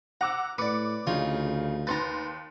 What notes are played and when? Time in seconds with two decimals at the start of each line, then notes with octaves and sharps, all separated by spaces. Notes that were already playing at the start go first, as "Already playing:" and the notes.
0.21 F#5 A#5 D6 E6
0.58 A2 B4 D5 D6 C#7
1.07 D2 C#3 D#4 F4 C#5
1.87 D#2 B4 A#5 C6 A6